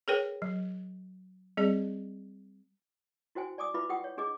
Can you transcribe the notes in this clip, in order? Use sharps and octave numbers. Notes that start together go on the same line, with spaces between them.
G#4 A#4 B4 C#5 G5
F#3
G3 C4 G#4 D5
E4 F#4 C5 G5 G#5
D5 G#5 D6 D#6
E4 F4 B4 E5 B5 D6
E4 F4 G4 F#5 G5 D#6
C#5
D4 G#4 D#5 D6